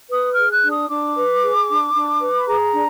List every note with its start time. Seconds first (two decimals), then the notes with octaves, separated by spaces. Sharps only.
0.10 B4 D#6
0.31 F6
0.37 G#4
0.50 F#6
0.64 D4
0.70 D#6
0.89 D4 D6
1.16 B4
1.42 G#4
1.69 D4
1.95 D4
2.21 B4
2.35 B5
2.47 G#4 A#5
2.73 D4